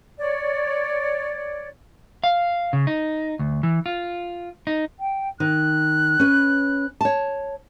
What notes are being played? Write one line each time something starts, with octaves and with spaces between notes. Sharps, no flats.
C#5 D5
F5
C#3
D#4
D2
E3
F4
D#4
G5
D#3 F#6
C#4 B4
C#5 A5